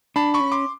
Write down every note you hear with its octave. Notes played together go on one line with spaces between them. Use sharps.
D4 A5 B5
B5 C#6
C#4
C6 D6